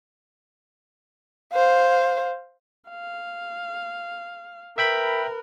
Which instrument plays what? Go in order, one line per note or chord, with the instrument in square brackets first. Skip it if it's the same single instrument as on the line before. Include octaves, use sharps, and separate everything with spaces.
[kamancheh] C5 F5
[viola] F5
[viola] A#4 B4 [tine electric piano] E5 G5 B5